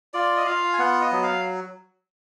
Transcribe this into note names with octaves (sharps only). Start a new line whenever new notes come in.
F4 D5
D#5
F4 F5
G#5
B3 F#5
D#5
F#3
F5